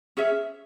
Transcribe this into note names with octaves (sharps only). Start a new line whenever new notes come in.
C#4 G#4 C#5 E5